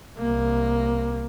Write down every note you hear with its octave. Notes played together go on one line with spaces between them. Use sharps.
C2 A#3